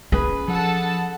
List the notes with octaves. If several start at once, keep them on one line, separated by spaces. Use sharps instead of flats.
C#4 G#4 B4
F3 A4 F#5 A5